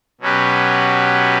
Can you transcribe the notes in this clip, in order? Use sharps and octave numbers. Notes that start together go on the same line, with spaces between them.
B2 F#3 C#4 G4 B4